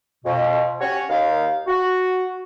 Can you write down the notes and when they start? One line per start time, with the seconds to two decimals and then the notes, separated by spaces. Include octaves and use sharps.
0.25 F2 B2
0.80 C#4 F#4 G4 C#5
1.09 D#2 D#4 F5
1.67 F#4